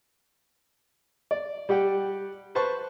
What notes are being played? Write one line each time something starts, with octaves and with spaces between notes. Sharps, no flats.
D5
G3 G4 F#5 G5
B4 C5 A5 C6 C#6